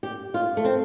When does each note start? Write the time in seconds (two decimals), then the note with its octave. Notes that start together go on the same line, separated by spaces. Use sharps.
0.03 G4
0.34 F4
0.57 A3
0.65 C4